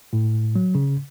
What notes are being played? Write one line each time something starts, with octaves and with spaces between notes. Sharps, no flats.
A2
F#3
C#3